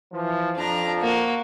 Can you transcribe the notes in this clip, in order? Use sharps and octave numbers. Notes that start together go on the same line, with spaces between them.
E3 F3
F2 F3 D4 A#5
A#3 F#4